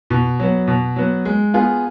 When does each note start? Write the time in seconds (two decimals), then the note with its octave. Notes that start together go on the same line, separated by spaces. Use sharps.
0.10 B2
0.40 F#3 B3
0.68 B2
0.96 F#3 B3
1.25 G#3
1.54 B3 F4 G#4